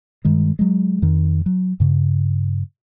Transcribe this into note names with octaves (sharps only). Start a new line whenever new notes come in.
G2 D#3 G#3
F#3 G#3
F2 D#3
F#3
G2 C#3